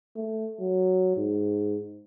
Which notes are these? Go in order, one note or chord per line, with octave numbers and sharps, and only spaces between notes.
A3
F#3
G#2